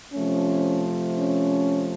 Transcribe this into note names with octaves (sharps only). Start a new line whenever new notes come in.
C3 F3 A3 C#4
C#4